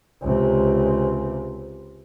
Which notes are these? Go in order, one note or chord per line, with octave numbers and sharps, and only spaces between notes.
C#2 C3